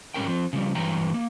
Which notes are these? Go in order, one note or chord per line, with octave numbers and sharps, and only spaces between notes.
G#2 G3 C#4 A#4 G5
F3 C4
C#3 F3 G3
G2 E3 F#3 G5 A#5
A#3